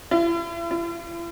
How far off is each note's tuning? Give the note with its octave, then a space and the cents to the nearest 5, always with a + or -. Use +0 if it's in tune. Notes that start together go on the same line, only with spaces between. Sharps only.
E4 +40
E4 +45